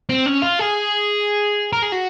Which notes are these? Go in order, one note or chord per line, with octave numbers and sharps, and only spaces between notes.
C4
C#4
F4
G#4
A#4
G#4
F#4